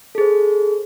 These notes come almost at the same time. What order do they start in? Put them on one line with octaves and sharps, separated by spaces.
A4 G#4 C5